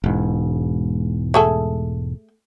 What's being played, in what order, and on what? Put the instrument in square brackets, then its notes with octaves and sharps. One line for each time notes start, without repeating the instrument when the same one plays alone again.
[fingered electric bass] E1 G#2
[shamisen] A3 G#4 A4